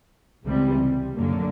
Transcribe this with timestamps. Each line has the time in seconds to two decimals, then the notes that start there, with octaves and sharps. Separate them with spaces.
0.45 C#2 C3 E3 G3
1.17 F#2 D3 F#3 A#3